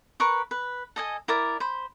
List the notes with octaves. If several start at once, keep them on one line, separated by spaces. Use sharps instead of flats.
A#4 B4 C#6
B4
A4 D#5 G#5
E4 A#4 D5
C5 B5